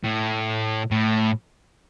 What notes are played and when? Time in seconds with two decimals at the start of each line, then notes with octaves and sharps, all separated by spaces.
0.04 A2
0.91 A2